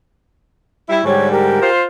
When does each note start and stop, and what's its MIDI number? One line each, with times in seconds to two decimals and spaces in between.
0.89 1.00 55
0.89 1.00 64
1.04 1.60 44
1.04 1.60 50
1.04 1.60 55
1.04 1.26 67
1.04 1.26 73
1.04 1.26 85
1.30 1.69 67
1.30 1.69 70
1.60 1.83 65
1.60 1.83 72